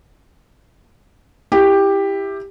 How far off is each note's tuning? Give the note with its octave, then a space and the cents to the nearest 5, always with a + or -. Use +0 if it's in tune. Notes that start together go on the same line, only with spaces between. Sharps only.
E4 +0 G4 +10